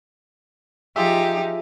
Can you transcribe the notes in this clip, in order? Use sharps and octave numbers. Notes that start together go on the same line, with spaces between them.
F3 D#4 F4 G4 G#4 E5